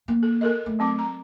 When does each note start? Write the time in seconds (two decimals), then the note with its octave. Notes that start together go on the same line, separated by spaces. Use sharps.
0.08 A#3
0.23 A4
0.41 A4 A#4 D#5
0.66 A3
0.79 F#3 C4 D6
0.99 A#5